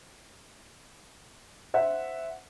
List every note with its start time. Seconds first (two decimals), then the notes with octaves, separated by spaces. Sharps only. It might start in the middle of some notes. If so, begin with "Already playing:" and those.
1.74 C5 E5 F#5